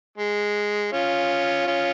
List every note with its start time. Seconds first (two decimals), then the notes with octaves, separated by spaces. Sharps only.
0.18 G#3
0.92 C#4 F4
1.67 C#4 F4